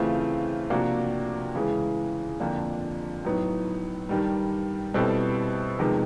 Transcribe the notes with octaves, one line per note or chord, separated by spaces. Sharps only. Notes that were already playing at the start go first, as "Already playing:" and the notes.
Already playing: C#3 E3 A3 C4 F4
C3 F3 A#3 D4 F#4
C#3 E3 G#3
F2 D3 F3 A#3 D4
A2 F#3 B3 D#4
G2 D#3 G3
B2 G3 C4 E4 A4
F2 C3 D#3 G#3 B3